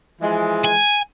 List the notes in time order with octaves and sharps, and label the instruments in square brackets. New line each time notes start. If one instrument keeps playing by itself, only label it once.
[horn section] E3 F3 G#3
[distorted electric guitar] G#5